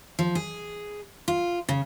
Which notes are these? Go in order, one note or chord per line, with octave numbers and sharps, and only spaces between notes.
F3
G#4
F4
C#3